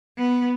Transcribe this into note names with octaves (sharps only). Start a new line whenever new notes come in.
B3